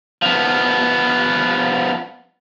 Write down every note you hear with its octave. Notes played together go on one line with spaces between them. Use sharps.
F3 B3